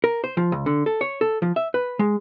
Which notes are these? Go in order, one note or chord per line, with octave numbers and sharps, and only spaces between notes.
A#4
C5
F3
C#2
D3
A4
C#5
A4
F3
E5
B4
G#3